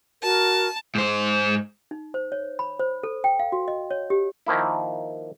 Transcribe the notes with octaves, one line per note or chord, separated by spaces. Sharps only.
F#4 A#4 A5
G#2 C5
D#4
C5
C#5
B5
C5
A4
G5
F5
F#4
D#5
C#5
G4
D#3 F3 A#3 E4